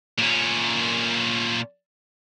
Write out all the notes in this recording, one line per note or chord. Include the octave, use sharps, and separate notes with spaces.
A#2 C#4